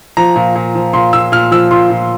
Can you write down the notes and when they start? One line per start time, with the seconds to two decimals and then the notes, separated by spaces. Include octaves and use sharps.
0.17 F3 A#5
0.36 A#2
0.55 A#2
0.75 F3
0.93 A#2 C6
1.13 A#2 E6
1.32 A#2 F6
1.51 F3 E6
1.71 A#2 C6
1.90 A#2